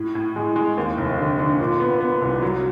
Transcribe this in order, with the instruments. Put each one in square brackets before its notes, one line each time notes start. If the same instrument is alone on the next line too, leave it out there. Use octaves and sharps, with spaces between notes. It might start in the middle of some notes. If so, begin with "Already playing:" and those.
Already playing: [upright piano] A2
A2
G#3
G#3
D#2
F1
D3
D3
A#2
B3
B3
C2
F#3